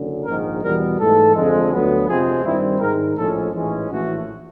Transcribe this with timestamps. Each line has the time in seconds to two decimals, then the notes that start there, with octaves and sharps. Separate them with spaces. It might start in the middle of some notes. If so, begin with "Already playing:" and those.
Already playing: F#1 F#2 D3
0.25 A#1 G#2 D#3 A#4
0.62 E2 B2 G3 B3 A#4
0.99 G#2 E3 A3 A4
1.35 F2 D3 F3 G#3
1.72 D2 D3 F#3 B3
2.08 F2 C3 F3 G#3 C4 G#4
2.45 G2 D#3 G3 C4 E4
2.81 G#2 D#3 G#3 A#4
3.17 A#1 A2 F3 G#3 C#4 A4
3.53 A1 G#2 E3 G#3 C#4
3.90 A#1 A2 E3 A3 F#4